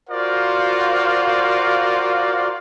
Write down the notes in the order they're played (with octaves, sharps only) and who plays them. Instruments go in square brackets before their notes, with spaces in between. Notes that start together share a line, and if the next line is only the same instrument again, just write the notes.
[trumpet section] F4 F#4 A#4 C5 D5 F5